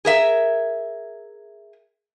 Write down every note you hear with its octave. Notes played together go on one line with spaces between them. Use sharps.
G#4 A#4 E5